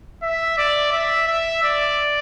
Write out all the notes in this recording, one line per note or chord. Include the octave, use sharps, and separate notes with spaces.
E5
D5
E5
E5
D5